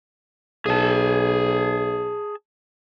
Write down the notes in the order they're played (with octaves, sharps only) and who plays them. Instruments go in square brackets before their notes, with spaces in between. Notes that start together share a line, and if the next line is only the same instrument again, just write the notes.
[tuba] B1 [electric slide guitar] G#4 A5